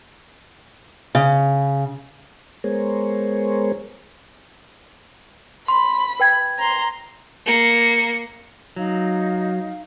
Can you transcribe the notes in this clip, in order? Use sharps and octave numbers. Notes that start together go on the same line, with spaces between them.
C#3
G#3 B3 G#4 A#4 C5 C#5
B5 C6
B4 G5 G#6
A#5 C6
A#3 C#7
F#3 D#4 F5